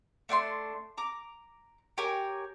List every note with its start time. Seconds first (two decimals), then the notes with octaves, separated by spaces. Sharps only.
0.29 A3 D4 F#5 C6
0.98 A#5 D6
1.98 G4 A#4 C#5 G#5